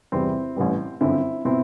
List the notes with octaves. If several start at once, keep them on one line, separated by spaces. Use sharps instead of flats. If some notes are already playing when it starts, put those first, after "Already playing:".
E2 C3 G3 C4 E4
A1 A2 E3 G3
G1 F#2 D3 C4 E4
B2 C4 E4